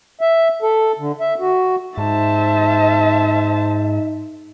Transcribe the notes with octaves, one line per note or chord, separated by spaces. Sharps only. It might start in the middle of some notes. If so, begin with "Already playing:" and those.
E5
A4
D3
E5
F#4
G#2 D#4 C5 E5 A5